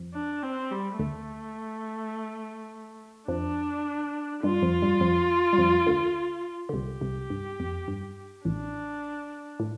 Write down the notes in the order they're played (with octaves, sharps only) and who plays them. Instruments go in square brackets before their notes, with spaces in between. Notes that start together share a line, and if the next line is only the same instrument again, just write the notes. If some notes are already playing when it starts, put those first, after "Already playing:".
Already playing: [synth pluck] F2 F3
[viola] D4
C4
G3
[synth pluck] D2 D3 [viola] A3
[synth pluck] F2 F3 [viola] D4
[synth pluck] G2 G3 [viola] F4
[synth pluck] F2 F3
G2 G3
F2 F3
G3
F2 F3
D2 D3
D3
[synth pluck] C2 C3 [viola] G4
[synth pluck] C2 C3
G2
F2
G2
[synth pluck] A1 A2 [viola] D4
[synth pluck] A2